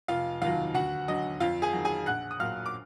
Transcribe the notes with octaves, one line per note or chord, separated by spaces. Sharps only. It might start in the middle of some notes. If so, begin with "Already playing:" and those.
F1 F4 F5
D#2 D#3 F#3 F4 F5
D2 F#4 F#5
D3 F#3 D#5
F2 F4 F5
G#4 G#5
D#3 F#3
G#4 G#5
A#1 F#5 F#6
D#6
A#2 F#3 F5 F6
D6